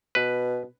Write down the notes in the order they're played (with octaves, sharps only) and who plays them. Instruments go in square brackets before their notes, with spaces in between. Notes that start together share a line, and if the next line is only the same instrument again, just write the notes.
[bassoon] B2 [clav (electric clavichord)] B4